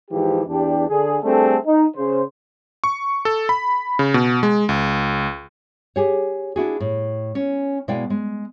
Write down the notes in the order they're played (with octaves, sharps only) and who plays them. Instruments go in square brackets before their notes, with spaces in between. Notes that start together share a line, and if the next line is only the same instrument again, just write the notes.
[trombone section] G#2 E3 F3 G4
E2 D4 G4
D3 G#4
G3 A3 C4 D4 G#4 A4
D#4
C#3 C5
[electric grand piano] C#6
A4
B5
C#3
B2
G#3
C#2
[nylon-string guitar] G4 G#4 C#5
D4 E4 F#4 G#4
A2
C#4
B2 G#3 E4 D5 F5 G5
G#3